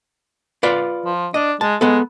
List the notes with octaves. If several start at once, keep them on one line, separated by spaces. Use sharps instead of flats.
F4 B4 D5
F3
D4 D#5
G#3 A5
G#3 B3 A4